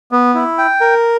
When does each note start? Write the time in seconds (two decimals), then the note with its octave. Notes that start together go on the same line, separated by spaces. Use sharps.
0.12 B3
0.35 E4
0.58 G5
0.81 A#4